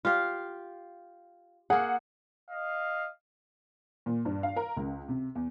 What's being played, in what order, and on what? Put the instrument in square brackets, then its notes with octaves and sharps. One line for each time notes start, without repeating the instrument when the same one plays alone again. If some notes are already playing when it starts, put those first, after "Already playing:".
[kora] F4 G4 F5
[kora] A#3 G#4 [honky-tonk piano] F#5
[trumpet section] D#5 F5
[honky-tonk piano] A#2
G2
F5
A#4
C#2
C3
E2